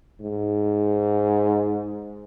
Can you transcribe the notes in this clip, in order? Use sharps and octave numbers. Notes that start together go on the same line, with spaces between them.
G#2